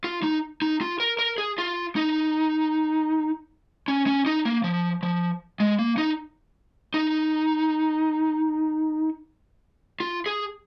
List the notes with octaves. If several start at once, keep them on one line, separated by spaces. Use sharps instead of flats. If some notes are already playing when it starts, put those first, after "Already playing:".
F4
D#4
D#4
F4
A#4
A#4
G#4
F4
D#4
C#4
C#4
D#4
A#3
F3
F3
G#3
A#3
D#4
D#4
F4
G#4